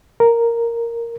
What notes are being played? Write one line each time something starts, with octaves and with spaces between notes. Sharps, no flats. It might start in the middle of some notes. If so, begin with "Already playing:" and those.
A#4